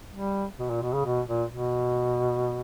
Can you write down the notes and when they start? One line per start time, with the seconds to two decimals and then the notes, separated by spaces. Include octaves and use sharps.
0.13 G3
0.59 B2
0.70 A#2
0.82 B2
0.93 C#3
1.05 B2
1.28 A#2
1.50 B2